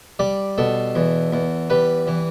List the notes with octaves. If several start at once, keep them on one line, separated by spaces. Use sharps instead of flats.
G3 D5
B2 A4
E2
E2
G3 B4
E3